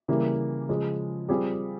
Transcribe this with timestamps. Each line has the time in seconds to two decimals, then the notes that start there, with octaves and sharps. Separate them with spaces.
0.08 C#3 E3 G3 A#3
0.69 C#3 F3 G#3
1.29 G3 C4 F4 G#4